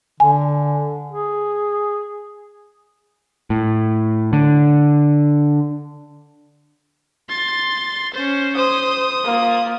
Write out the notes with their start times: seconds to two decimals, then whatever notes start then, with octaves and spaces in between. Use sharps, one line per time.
0.20 D3 G#5
1.12 G#4
3.50 A2
4.33 D3
7.29 C6 A6
8.14 C#4 C5
8.56 C5 D#6
9.25 A#3 F4